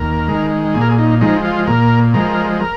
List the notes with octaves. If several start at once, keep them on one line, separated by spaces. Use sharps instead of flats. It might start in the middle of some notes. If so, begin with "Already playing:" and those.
Already playing: D#2 A#4
D#3 G#3
A#2 G#4
A#4
G#4
D#4
F3 G#3 D#4
F4
A#2 A#4
F3 G#3 A#4
A#4